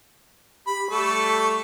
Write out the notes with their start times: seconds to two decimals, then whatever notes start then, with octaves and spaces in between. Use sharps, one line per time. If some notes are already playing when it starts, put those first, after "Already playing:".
0.67 G4 B5
0.91 G3 A3 A4 C#6